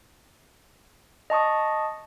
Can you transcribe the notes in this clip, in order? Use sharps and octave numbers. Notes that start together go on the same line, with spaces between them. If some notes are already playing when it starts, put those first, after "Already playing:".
D#5 A5 C#6 D#6